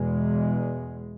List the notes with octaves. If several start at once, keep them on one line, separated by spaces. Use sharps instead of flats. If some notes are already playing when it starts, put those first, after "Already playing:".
Already playing: E2 B2 G#3